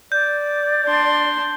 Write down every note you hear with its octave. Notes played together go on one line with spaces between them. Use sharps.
D5 G6
D4 C6